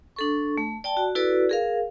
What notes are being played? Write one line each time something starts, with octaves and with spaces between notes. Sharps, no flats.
D4 A4 C#6
A3
D5 G5 A5
F#4
E4 F#4 A4 B4 D5
G#4 A#4 F5